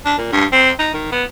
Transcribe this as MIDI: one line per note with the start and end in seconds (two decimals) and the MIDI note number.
0.05 0.14 62
0.18 0.30 46
0.32 0.45 43
0.52 0.71 60
0.79 0.91 63
0.94 1.10 51
1.12 1.24 59